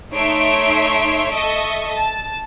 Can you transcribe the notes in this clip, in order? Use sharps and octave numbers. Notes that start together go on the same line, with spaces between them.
A3 D#4 C#5 E5 C6 D7
A4 D#5 E5 C#6
A5